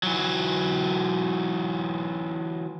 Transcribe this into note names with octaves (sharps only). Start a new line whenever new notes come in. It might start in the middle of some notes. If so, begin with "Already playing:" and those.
E3 F#3